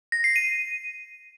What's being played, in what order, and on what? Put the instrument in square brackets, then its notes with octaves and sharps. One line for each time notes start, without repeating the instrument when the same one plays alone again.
[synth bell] A#6
C7
D#7